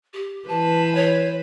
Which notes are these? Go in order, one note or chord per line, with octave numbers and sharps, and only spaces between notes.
G4
E3 B4 C5 A5
C#5